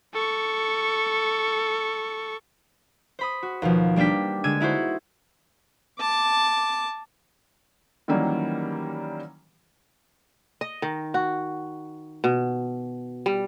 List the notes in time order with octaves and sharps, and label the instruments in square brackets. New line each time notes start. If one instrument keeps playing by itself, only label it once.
[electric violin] A4 C#6
[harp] C5 B5 D#6
F#4
D#2 B2 F3
G3 A#3 D4 G5 B6
D3 G#3 E6 G#6 D#7
D#4 E4 F#4 C5
[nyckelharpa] A5 D6
[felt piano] D#3 E3 F#3 G3 A#3 C#4
[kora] D#5
D#3
F#4
B2
G3